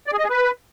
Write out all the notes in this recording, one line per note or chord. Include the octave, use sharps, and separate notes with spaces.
D5
G#4
D#5
G#4
B4